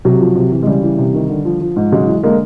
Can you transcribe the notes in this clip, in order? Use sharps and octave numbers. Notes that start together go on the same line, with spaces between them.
C3 F#3
F3
C3
E3
G#3
C#3 G3
E3
C3
D#3
D3
F3
F3
G#2
C#3 F#3 G#3
E3
D3 G#3 A#3